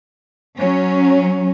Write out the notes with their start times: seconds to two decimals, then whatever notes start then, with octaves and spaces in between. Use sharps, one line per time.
0.58 F#3 C#4